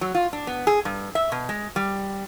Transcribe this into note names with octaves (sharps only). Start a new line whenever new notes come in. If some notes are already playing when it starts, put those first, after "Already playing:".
F#3
F4
D4
B3
G#4
G2
E5
B2
G#3
G3